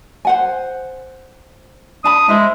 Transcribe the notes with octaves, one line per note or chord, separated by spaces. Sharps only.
C5 F#5 G#5
D4 A5 B5 D#6
G#3 E4 C5